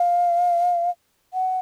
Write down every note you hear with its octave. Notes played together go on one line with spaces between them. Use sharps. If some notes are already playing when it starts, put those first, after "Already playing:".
Already playing: F5
F#5